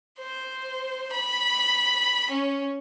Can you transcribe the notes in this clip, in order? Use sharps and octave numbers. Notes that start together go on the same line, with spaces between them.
C5
B5
C#4